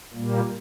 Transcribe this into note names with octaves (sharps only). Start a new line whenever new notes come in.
A#2 G3 A#3